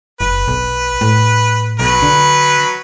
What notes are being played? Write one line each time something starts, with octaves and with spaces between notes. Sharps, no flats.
F#1 B4
B1
A2
B1 F#3 B4
D3